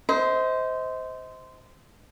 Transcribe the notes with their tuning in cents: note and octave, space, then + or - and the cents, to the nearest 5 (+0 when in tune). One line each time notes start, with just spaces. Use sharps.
C5 -15 D#5 +35